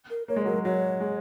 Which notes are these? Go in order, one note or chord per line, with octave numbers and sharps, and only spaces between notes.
A#4
A#3 C#5
G#3
F#3 A#4
G#3
F#3 C#5
G#3